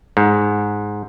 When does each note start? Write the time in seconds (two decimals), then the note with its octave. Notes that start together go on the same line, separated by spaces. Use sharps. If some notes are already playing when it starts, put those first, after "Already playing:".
0.17 G#2